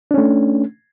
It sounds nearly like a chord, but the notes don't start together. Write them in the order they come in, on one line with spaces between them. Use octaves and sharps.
D4 C#4 A3